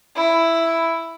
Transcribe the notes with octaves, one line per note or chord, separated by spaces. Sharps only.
E4